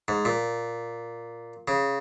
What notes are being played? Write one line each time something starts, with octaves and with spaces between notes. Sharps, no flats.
G#2
A#2
C#3